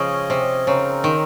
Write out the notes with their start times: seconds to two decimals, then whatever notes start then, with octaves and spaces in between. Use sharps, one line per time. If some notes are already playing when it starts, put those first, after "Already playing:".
Already playing: C#3 F3 G#3 C#4 G#4 D#5
0.30 C3
0.67 C#3 C4 D#4 A#4
1.04 D#3